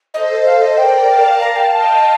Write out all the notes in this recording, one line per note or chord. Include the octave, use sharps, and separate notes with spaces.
A4 C5 D#5
A4 C5 F5
D#5
A#4 D5 G5
F5 A5
F5 A5 A#5
G5
D#5 G5 A5